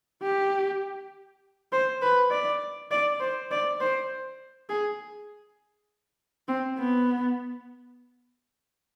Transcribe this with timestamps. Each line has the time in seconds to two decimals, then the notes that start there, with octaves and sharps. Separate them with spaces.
0.22 G4
1.72 C5
2.02 B4
2.31 D5
2.91 D5
3.20 C5
3.51 D5
3.80 C5
4.70 G#4
6.48 C4
6.78 B3